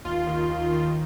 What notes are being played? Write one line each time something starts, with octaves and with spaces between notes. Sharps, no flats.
D#2 F4
D#3
D#2
D#3